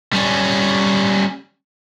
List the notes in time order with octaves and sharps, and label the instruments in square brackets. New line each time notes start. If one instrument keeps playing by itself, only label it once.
[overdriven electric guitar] G3 C#4